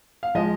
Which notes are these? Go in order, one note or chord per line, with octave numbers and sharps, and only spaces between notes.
F5
F3 G#3 D#5